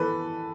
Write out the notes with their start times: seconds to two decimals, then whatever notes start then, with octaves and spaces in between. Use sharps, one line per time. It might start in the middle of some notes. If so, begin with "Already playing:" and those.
Already playing: E3 B3 A4 B4